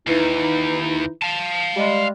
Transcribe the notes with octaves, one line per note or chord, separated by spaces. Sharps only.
D#2 E3 D#4 E4
F5 A5
G3 G#3